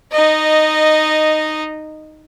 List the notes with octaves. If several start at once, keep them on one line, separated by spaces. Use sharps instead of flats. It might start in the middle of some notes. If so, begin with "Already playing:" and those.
D#4 D#5